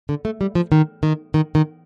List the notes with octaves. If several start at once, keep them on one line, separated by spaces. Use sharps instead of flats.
D3
A3
G3
F3
D#3
D#3
D#3
D#3